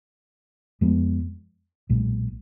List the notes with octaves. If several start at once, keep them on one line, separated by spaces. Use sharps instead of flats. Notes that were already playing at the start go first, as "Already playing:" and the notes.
F2 F3 G#3 B3
B1 A#2 G#3